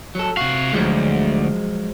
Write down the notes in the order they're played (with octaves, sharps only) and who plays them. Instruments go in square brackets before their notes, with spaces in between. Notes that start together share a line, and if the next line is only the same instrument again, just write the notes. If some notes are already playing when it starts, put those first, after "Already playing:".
[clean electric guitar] F#3 A4
[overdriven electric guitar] C3 F5 [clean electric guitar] F#4
[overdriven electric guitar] D2 [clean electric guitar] F3 F#3 G#3